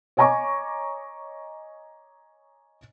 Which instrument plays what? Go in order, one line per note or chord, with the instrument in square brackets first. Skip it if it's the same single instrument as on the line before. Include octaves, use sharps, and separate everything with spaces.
[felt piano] C#5 D#5 G#5 A#5 C#6 D6